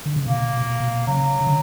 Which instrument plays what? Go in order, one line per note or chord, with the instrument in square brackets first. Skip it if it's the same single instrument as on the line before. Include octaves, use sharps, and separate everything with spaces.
[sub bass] D3
C#3
[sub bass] B2 [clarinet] A#3
[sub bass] B2
B2
[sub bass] C#3 [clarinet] F#3
[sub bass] C#3
D3